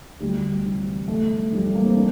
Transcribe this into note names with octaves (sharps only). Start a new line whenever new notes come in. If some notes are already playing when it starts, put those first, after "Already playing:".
D2 G3
C3 E3
G1 A3
F2 E3 G3
A3
A#3
C4
D4